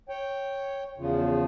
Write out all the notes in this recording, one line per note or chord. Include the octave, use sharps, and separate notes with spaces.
C#5 G5
E2 C#3 F3